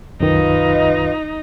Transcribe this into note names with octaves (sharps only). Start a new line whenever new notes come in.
C2 F#2 D#3 D#4 F4 B4 D#5